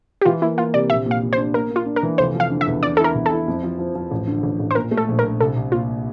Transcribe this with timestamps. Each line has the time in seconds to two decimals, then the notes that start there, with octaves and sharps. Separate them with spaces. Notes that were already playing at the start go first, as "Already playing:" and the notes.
0.21 G4
0.25 E3 F4
0.42 A#3 E4
0.57 A#3 F4
0.73 C3 D5
0.89 A#1 E5
1.06 A#2
1.11 F5
1.22 A#2
1.33 C5
1.38 D4
1.54 A#3 A#4
1.71 A#3
1.76 F4
1.86 D4
1.96 A#4
2.03 E3
2.18 F1 C5
2.35 F3
2.40 F5
2.51 D3
2.61 E5
2.67 E2
2.83 D3 D5
2.97 E4 A4
3.04 A#4
3.15 E2
3.26 E4 A4
3.48 F2
3.63 F3
3.79 F3
3.95 F3
4.11 A1
4.27 D3
4.43 A1
4.59 A1
4.71 C5
4.75 A#2 A#4
4.91 A3
4.97 A4
5.08 A#1
5.19 A#4
5.24 A#1
5.40 C2 A4
5.56 C2
5.72 A#2 F4